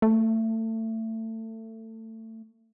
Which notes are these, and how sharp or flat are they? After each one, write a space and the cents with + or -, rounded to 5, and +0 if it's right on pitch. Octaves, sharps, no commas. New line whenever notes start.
A3 +25